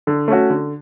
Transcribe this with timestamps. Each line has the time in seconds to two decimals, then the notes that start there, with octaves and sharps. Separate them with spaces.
0.07 D3
0.28 A3 C#4 F#4
0.50 D3